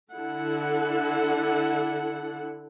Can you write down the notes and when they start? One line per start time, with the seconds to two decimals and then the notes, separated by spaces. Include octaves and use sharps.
0.14 D3 E4 A4 F#5